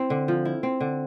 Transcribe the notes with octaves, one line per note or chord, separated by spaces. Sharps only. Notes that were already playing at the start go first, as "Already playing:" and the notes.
Already playing: C4 E4
D3
F3
E4
C4
D3